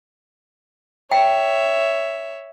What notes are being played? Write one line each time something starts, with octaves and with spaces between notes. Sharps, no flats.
C#5 E5 G5